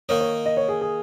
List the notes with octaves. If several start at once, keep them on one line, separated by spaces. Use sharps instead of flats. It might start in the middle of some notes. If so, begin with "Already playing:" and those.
D#3 A#3 D#4 C#5
C#5
D#5
C#5
G#4
G#4